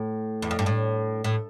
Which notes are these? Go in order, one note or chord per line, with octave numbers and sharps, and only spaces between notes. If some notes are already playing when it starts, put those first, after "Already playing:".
Already playing: A2
E2
F2
G2
A2
A2